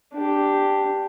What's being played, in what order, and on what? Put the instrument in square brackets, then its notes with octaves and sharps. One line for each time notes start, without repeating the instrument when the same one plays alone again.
[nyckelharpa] D4 G4